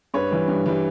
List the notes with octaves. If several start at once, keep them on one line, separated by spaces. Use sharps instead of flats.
G2 B4 C#5
E3 G3
G2
E3 G3